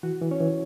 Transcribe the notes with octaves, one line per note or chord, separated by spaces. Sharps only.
E3 F#4 F#5
E3
C#4 C#5
E3